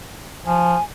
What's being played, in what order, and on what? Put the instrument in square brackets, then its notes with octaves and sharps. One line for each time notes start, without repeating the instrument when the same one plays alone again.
[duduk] F3 [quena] G#5